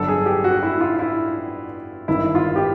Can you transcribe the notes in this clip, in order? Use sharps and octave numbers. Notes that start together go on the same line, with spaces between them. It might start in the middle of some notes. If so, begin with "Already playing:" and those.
Already playing: G1 G2 D3 F#3 A4
G#4
G4
F#4
E4
F4
E4
G#1 G2 D#3 E4
F4
G4